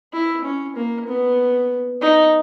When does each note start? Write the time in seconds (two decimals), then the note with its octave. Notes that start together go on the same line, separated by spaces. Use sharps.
0.13 E4
0.44 C#4
0.76 A#3
1.07 B3
2.01 D#4